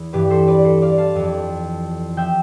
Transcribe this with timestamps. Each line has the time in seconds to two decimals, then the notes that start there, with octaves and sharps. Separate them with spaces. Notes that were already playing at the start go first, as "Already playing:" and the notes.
Already playing: E2 E4
0.13 G2 E3 G4 B4
0.30 A4 C5
0.48 B4 D5
0.64 A4 C5
0.82 D5 F5
0.98 F5 A5
1.15 F2 E3
2.17 F3 E5 G5